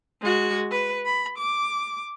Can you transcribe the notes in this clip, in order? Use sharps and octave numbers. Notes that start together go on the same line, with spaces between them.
G#3 F#4
B4
B5
D6